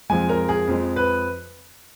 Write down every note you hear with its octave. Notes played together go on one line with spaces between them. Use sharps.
F2 F3 G#3 G#5
A#4
G#4
F2 F3 G#3
B4